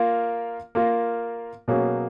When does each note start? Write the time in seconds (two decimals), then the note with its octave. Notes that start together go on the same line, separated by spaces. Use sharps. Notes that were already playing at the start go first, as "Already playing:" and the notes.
Already playing: A#3 F4 A#4
0.75 A#3 F4 A#4
1.68 B2 F#3 A#3 C#4 G#4